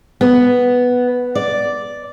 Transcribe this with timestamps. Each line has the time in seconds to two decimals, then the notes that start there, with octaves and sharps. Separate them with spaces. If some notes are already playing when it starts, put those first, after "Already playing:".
0.21 B3
1.35 D5